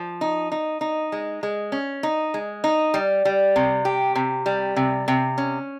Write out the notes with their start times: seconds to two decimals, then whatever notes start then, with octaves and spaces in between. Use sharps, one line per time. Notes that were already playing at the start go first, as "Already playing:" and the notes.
Already playing: F3
0.21 D#4
0.52 D#4
0.81 D#4
1.12 G#3
1.43 G#3
1.72 C#4
2.03 D#4
2.34 G#3
2.64 D#4
2.94 G3
3.25 G3
3.56 C3
3.85 G4
4.15 C3
4.46 G3
4.76 C3
5.08 C3
5.38 C#4